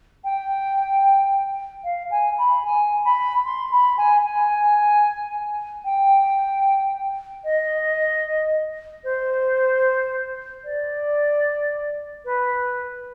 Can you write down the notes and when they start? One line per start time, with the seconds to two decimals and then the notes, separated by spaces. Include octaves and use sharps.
0.24 G5
1.84 F5
2.11 G#5
2.37 B5
2.64 G#5
3.04 B5
3.44 C6
3.71 B5
3.97 G#5
4.24 G#5
5.85 G5
7.44 D#5
9.04 C5
10.64 D5
12.25 B4